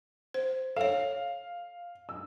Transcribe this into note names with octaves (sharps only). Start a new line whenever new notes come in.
C5
A4 C#5 F5
E6